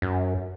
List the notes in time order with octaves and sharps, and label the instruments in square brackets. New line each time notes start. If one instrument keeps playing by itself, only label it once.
[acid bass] F#2